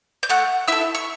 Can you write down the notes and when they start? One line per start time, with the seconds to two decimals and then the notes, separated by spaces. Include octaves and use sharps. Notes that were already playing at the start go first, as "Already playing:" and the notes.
0.23 G6
0.29 A3 F#5 F#6
0.68 E4 A4 E5 E6
0.95 C#6